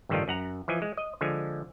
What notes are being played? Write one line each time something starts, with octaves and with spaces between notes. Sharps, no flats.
A1 G2 D3 D#3 G3 F4
F#2 F#5 A#5
E3 F3 D#5 G#5
G#3
D#5
D3 F3 G#3 G#5